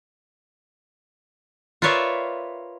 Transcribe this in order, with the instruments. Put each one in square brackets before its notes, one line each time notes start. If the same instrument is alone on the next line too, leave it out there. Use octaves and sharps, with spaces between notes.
[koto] F4 A#4 B4 C#5 D5 E5